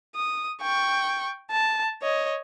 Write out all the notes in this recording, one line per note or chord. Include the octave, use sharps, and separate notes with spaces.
D#6
G5 C#6
A5
C#5 D#5